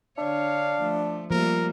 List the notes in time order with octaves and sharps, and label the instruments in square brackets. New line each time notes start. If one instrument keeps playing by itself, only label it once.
[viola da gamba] D3 C#5 [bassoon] D4 [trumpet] F5
[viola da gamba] F3 A3
[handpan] F3 [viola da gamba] G3 A3 A#3 [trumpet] A#4